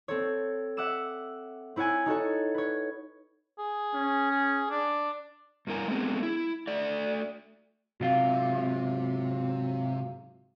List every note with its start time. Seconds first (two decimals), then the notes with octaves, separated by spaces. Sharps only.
0.08 C4 A4 C#5
0.77 E5 F#5 D6 E6 E7
1.76 C4 E4 C#5 F#5 G#5
2.06 D#4 F#4 A4 C#5
2.54 B4 C#5
3.58 G#4
3.94 C#4
4.31 G#4
4.70 D4
5.67 G2 E4 A#4 G#5
5.88 G#3 A3 B3 C4 G#4
6.23 E4
6.67 A3 D5
8.01 G#2 C3 F#3 F4 F5